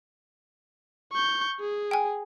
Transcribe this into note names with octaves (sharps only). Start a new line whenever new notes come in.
C#6 G6
G#4
G5 G#5